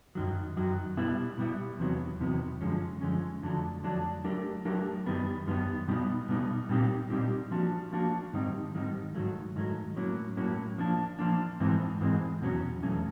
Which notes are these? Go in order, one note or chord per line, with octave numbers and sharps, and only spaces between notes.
F#2 D#3 F#3
F#2 D#3 F#3
B2 G3 B3 E4
B2 G3 B3 E4
E2 C3 D#3 F#3 B3
E2 C3 D#3 F#3 B3
F#2 D3 F3 G#3 C#4
F#2 D3 F3 G#3 C#4
F2 D3 F#3 A3 D4
F2 D3 F#3 A3 D4
F#3 A3 D4 G4 A#4
F#3 A3 D4 G4 A#4
F#2 D#3 G3 B3
F#2 D#3 G3 B3
B2 G3 B3 D#4
B2 G3 B3 D#4
A#2 G3 C4 D#4 G4
A#2 G3 C4 D#4 G4
F3 A#3 D4 F#4
F3 A#3 D4 F#4
G#2 D#3 G3 C4 D#4
G#2 D#3 G3 C4 D#4
G#2 D#3 F#3 A3
G#2 D#3 F#3 A3
A2 F#3 A#3 C#4
A2 F#3 A#3 C#4
F3 A#3 D4
F3 A#3 D4
G#2 E3 G#3 C4
G#2 E3 G#3 C4
E2 B2 F#3 A3 C#4
E2 B2 F#3 A3 C#4